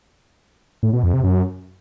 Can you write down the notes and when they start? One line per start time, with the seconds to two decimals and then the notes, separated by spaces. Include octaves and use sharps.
0.83 A2
0.93 B2
1.03 F2
1.13 C3
1.24 F#2